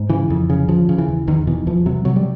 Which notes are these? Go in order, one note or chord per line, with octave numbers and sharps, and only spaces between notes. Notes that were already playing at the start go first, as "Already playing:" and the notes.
Already playing: G#2
C#3 E3
F2
C#3
C#3 F3
C#3
E3
E2
E2 D#3
B2 E3
E2 F3
C3 F#3
C3 F#3
G3